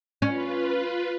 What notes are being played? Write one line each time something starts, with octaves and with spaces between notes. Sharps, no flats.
C#4 F4 B4